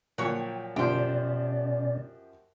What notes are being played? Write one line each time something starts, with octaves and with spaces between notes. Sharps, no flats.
A#2 F3 F#3 C#5 G5
F#2 B2 F3 C#4 G4 C5 D5